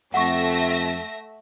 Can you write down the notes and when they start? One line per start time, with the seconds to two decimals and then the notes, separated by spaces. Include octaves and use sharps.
0.14 F2 A3 E5 F#5 C#6 A#6